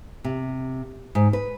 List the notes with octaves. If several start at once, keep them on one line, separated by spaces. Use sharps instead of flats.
C3
G#2
B4